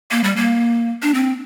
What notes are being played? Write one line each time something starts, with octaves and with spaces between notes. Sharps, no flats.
A#3
G3
A#3
D4
C4